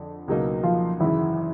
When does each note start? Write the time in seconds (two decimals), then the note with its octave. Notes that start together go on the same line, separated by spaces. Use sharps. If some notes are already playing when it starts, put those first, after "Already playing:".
Already playing: F2 D3 F3
0.28 C#2 B2 F#3 A#3 D#4
0.64 F3 F4
1.00 G#1 F#2 C#3 E3 E4